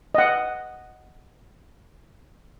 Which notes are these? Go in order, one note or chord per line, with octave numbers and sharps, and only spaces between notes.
D#5 F#5